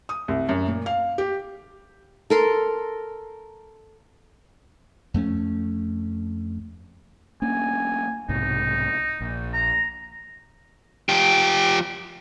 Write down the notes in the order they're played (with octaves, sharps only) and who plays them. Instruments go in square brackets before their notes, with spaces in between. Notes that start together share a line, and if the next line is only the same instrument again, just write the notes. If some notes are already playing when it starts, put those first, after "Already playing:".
[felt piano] D#6
C2
F#2
A#2
F5
G4
[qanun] A4 A#4 C6
[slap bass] F2 A3 C#4
[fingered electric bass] A#3 C#4 D4 [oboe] G#5
[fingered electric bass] B1 G#2 C3 [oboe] D#4
[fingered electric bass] A#1
[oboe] A#5
[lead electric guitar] F3 G4